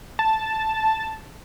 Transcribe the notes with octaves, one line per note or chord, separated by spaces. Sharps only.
A5